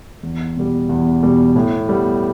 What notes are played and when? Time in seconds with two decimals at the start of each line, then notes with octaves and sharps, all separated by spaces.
0.23 E2
0.57 B2 G3
0.89 E2
1.23 B2 G3
1.56 A2
1.89 G3 B3